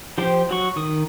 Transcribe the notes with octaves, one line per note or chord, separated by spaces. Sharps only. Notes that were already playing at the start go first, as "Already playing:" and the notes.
F3 G4 C5 G5
F#3 F#4 C#6
D#3 D#6